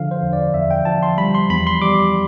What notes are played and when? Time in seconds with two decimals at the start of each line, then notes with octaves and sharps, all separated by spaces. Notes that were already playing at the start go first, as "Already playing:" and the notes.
Already playing: D3 F3 F5
0.11 C5
0.23 E2
0.33 D5
0.54 E2 E5
0.71 G5
0.85 F3 A5
1.03 C6
1.18 G3 B5
1.35 C6
1.50 E2 B5
1.67 C6
1.82 G3 D6